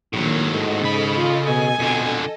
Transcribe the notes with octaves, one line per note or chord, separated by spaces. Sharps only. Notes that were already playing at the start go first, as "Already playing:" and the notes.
A#1 A2 D#3 F#3 A#3
G#2 A4 D#5
C#3 B5
F4
B2 G#5
F2 B2 D3